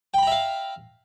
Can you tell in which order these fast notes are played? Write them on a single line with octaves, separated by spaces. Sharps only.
G5 B5 A#5 E5 F5